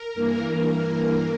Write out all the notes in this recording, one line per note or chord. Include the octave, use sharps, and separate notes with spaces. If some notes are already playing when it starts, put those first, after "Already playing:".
Already playing: A#4
G2 E3 A#3